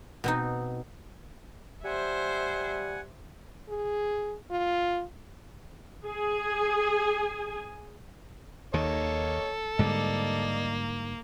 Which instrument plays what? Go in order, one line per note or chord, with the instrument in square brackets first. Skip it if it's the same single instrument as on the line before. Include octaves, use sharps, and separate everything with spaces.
[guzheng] B2 C4 D#4
[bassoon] G3 [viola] C5 E5 [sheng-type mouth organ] F#5 G#5
[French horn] G#4
F4
[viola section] G#4 G#5
[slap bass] D#2 D#3 [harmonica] A#3 C#5 D#5 [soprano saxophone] A4
[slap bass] G#2 D3 G3 [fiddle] A#3 [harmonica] D5 D#5